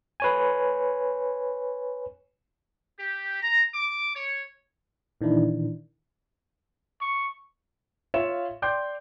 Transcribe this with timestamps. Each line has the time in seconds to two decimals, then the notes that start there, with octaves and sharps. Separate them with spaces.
0.20 B4 C#5 G#5
3.00 G4
3.42 A#5
3.75 D6
4.16 C#5
5.21 A#2 D#3 E3 D4 E4
7.01 C#6
8.14 F4 C#5 E5 F5 E7
8.62 D5 G5 C6 D6 G6